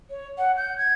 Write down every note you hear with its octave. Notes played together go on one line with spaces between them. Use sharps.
C#5
F#5
G6
G#6